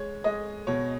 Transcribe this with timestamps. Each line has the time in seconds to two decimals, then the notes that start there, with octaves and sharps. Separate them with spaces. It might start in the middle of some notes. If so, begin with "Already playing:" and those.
Already playing: G#3 C#5
0.24 G#3 D#5
0.67 B2 C#5